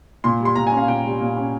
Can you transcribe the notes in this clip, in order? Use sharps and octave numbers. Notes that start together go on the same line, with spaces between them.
A#2 C6
G3
C6
A#2 A#5
G#5
C#4
F5
A#2 G5
G3
A#2
C#4